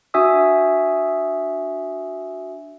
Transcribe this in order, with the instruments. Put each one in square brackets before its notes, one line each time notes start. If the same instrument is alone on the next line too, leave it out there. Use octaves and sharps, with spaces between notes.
[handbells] D4 F#4 E5 G#5 D#6 E6